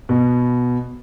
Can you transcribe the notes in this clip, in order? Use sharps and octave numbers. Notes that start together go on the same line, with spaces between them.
B2